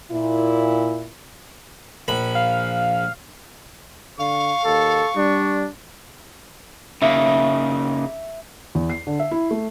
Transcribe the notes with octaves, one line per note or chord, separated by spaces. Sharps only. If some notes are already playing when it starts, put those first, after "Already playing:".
A#2 E4
A#1 B5
F5
D3 F5 C#6
D#2 A4 C#6
G3 D4
C#3 A#3 D#4 E5
E2
C7
D3
E5
E4
A3